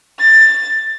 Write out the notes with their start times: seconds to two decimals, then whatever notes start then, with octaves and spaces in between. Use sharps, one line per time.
0.19 A6